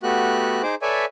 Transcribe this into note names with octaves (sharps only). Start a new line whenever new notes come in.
A3 B3 F#4 G4 F#6
D#4 G#4 C5 D6
A4 B4 C#5 D5 E5 G#5